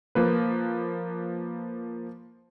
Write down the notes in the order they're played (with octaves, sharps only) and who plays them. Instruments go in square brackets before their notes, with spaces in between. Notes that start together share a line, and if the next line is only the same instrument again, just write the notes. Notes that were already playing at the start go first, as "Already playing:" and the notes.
[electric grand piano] F3 A#3 B4